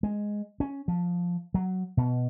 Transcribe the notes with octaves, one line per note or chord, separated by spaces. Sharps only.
G#3
C#4
F3
F#3
B2